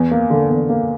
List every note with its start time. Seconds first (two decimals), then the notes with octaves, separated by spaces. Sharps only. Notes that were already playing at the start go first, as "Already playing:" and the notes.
Already playing: E2
0.11 A#3
0.30 D3
0.49 E2
0.69 A#3